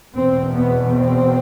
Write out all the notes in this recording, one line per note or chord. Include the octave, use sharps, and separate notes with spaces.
E2 B2 C4
B3
C4